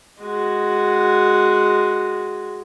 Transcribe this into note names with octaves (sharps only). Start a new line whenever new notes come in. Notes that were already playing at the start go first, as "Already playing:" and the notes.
G#3 F#4